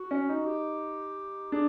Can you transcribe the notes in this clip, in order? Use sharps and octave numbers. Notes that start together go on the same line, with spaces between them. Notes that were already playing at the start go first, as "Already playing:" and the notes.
Already playing: F#4
C#4
D#4
G4
D4 G#4